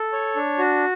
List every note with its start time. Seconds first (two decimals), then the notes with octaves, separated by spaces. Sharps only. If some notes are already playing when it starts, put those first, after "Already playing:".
Already playing: A4
0.12 C#5
0.36 D4
0.58 F#4